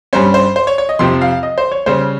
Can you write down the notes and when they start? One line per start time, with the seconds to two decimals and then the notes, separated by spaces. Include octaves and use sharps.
0.13 G2 G3 C#4 C5
0.34 C5
0.56 C5
0.67 C#5
0.78 C#5
0.89 D#5
0.99 F2 C3 F3 C4 C6
1.21 F5
1.43 D#5
1.58 C5
1.72 C#5
1.86 C#3 G3 C#4 C5